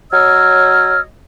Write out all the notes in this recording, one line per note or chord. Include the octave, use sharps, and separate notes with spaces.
F#3 C#5 D#5 E6 F6